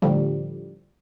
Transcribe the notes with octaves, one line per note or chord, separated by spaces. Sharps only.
A2 D3 F3 G3